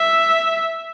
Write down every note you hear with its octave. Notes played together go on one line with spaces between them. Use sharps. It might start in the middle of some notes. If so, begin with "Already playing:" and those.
Already playing: E5